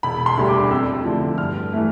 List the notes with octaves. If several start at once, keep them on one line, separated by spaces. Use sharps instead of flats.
E1 B5
C6
D2 D3 G3
D6
F2 E6
D3 F3 A3 E4
G2 F6
E3 A3 E4